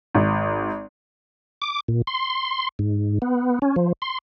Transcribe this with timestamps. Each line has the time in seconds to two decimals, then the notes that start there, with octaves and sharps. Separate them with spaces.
0.15 G#1
1.62 D6
1.88 A#2
2.07 C6
2.79 G#2
3.22 B3
3.62 C#4
3.76 F3
4.02 C6